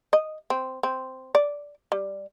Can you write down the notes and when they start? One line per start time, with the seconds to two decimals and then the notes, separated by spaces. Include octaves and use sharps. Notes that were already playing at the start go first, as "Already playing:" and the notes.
0.13 D#5
0.50 C4
0.83 C4
1.35 D5
1.92 G3